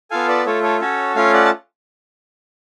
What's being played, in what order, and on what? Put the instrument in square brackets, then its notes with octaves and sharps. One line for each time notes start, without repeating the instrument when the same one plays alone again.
[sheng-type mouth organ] B3 F4 A4 F5 G#5
B4 D5
A3 F4 A4 C#5
A4 C#5
C#4 F#4 A4 C#5
A3 C#4 F4 C#5 F5
D5 F#5
A5